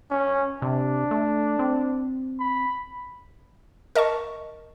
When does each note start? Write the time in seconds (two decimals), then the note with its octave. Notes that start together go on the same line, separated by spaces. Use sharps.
0.11 C#4
0.62 C3 D4
1.11 A3
1.59 C4
2.40 B5
3.95 A#4 D#5 A5 C#6